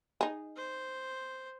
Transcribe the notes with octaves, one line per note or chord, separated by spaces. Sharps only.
D#4 G#4
C5